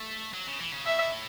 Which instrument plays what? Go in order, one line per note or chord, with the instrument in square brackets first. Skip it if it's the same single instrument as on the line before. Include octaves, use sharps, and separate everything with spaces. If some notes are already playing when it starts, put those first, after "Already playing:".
Already playing: [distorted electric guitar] A3
F#3
C#3
E3
C#3
[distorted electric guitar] B2 [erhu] E5
[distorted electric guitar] A2